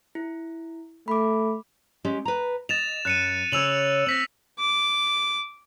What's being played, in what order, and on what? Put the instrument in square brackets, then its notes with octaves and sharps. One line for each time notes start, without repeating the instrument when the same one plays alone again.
[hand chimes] E4
[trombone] A3 [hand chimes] B5 D6
[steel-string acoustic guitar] G#3 C#4 G4
B4 A#5
[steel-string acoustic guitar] D#5 [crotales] A6 E7 F7
[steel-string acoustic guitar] F#2 [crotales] F#6 C#7 D#7
[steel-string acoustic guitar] C#3 C#5 [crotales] E6 F7 F#7
[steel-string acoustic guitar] C4 [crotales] A#6 B6 F#7
[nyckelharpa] D6